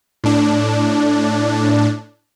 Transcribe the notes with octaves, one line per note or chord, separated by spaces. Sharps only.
A2 D4